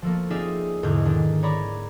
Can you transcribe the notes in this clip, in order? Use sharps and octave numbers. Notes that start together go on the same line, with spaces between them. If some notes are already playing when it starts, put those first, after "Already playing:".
F3 A3 A#3
C4 D#4 F4 G#4 D5 E5
E1 E2 G#2 D3 G6 G#6
D#3 D4
C#5 D5 A#5 B5 D6